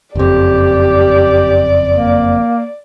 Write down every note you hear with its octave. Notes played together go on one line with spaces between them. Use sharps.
F#1 F2 G4 D5
A#3